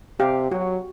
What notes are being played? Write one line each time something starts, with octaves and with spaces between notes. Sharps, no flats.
C3 G4 F5
F#3 F#4